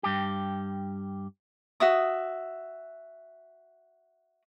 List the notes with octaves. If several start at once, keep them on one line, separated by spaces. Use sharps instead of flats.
G2 G4
F#4 E5 D#6